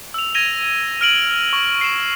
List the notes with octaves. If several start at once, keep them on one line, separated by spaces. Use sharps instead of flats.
E6 F7
G#6 A#6 D#7 F7 G7
F6 D7 F#7
C#6
C7 E7